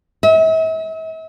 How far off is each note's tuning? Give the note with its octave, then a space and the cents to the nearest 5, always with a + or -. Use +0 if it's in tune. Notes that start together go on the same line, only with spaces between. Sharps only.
E5 -40